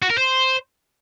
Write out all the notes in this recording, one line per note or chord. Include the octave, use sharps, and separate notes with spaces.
F#4
A#4
C5